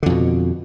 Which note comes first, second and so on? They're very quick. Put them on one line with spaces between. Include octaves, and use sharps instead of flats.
D3 F2 B2